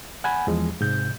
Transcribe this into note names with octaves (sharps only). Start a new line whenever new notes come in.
F#5 G#5 B5
E2 F3 G#3
G#2 C3 G6